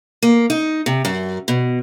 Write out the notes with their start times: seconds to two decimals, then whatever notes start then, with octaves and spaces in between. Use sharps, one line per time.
0.23 A#3
0.50 D#4
0.86 C3
1.05 F#2
1.48 B2